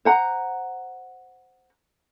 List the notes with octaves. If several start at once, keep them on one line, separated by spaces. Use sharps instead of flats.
C5 F#5 A#5